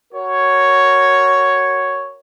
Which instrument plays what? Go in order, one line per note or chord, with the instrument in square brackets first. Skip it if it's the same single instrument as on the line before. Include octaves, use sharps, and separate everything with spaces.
[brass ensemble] F#4 A#4 C#5